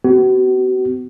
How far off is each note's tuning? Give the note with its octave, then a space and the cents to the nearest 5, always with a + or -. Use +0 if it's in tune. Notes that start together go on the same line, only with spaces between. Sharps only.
B3 +40 F#4 +35